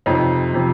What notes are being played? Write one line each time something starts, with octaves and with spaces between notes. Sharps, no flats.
F2 C3 F3 D#4
C3 F3